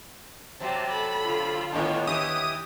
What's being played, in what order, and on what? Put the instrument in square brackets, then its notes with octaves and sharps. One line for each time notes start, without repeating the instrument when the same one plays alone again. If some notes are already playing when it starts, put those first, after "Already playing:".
[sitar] C3 F#3 C4 [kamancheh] G4 C5 [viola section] A5
[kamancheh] A4 B5
[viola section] D3 F4
[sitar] A2 D#3 D4 [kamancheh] B3 C#5
[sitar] D#2 E3 [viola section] G4 [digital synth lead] D#6